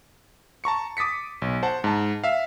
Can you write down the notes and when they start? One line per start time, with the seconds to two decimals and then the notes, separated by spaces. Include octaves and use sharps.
0.64 A5 A#5 C#6 C#7
0.97 D6 D#6 A6 B6 C#7
1.42 B1
1.63 C5 F#5 A5
1.84 G#2 A5
2.24 E5 F5